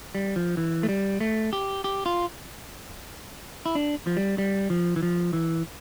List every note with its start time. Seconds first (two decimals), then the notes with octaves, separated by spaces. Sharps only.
0.15 G3
0.36 F3
0.57 E3
0.83 A3
0.89 G3
1.21 A3
1.53 G4
1.84 G4
2.06 F4
3.66 E4
3.75 D4
4.07 F3
4.17 G3
4.38 G3
4.70 F3
4.96 E3
5.03 F3
5.33 E3